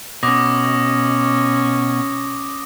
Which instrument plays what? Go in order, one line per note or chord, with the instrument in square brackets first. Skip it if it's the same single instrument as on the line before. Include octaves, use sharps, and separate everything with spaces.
[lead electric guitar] B2 [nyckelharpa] C#4 [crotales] D6 D#6 A#6